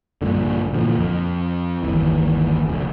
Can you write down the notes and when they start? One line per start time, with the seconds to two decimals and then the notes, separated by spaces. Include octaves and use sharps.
0.22 A#1 G2 A#2 D3
0.73 A#2 D3 E3 F3
0.99 F2
1.83 G1 D#2 E3
2.68 F1 D2